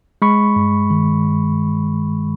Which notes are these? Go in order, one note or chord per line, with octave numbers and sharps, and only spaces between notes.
G#3 B5 C#6
G2
D#3
G2